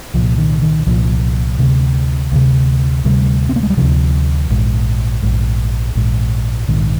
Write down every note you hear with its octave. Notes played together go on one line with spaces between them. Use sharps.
C2 A#2 F3
D#3
D#3
C2 A#2 F3
D2 C3
D2 C3
D2 C3 G3
C4
A#3
G#3
G3
D2 C3 F3
A#1 G#2
A#1 G#2
A#1 G#2
A#1 G#2 D#3